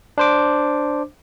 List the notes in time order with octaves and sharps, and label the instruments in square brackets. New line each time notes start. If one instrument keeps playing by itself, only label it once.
[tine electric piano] D4 C5 D6